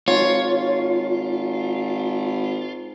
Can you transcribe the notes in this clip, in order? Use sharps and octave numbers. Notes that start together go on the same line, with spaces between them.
G#1 F4 C#5